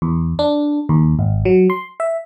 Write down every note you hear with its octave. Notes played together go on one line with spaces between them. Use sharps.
E2
D4
D#2
G#1
F#3
C6
E5